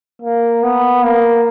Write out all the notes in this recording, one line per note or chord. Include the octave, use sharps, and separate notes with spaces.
A#3
B3
A#3